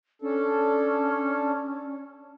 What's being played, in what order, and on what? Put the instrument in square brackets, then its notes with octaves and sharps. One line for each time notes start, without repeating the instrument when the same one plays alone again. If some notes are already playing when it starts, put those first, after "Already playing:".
[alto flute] C#4 [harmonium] D4 A4